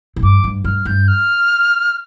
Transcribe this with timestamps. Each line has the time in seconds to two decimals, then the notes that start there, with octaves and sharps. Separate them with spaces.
0.16 A2
0.23 G2 D6
0.44 G2
0.64 G2 F6
0.85 G2 G6
1.07 F6